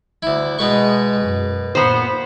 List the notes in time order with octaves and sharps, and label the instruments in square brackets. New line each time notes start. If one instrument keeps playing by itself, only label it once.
[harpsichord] D2 E4
[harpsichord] B2 B4 C#6 [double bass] G#3
[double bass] F#2
[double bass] A#2 [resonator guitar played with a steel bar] B3 C5